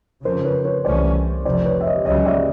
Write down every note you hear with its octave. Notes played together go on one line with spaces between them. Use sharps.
F2 C#3 F3 A#4 C5
B4 C#5
B4 C#5
C2 C3 E3 A3 C#4 C5 D5
F1 F2 C3 C5 D5
B4 C#5
E5
C#5 D#5
C#2 C#3 F#3 C#5 D#5
D5 E5